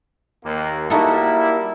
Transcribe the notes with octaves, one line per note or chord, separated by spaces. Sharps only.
D#2 A#3
G3 A#3 D#4 E4 F#4 A4